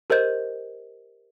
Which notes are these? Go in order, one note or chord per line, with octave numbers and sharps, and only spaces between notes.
G4 A#4 C5 D#5 G6